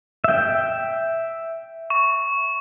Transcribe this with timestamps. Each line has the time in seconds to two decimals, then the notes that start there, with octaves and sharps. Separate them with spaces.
0.24 E5 G5
1.90 C#6